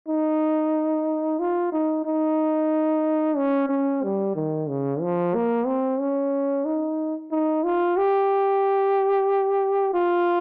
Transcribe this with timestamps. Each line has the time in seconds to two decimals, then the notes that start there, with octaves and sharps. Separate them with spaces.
0.08 D#4
1.39 F4
1.73 D#4
2.05 D#4
3.37 C#4
3.69 C#4
4.03 G3
4.36 D#3
4.69 C#3
5.01 F3
5.35 A#3
5.66 C4
6.00 C#4
6.65 D#4
7.31 D#4
7.64 F4
7.97 G4
9.94 F4